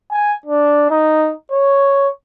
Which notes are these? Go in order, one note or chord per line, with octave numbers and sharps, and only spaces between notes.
G#5
D4
D#4
C#5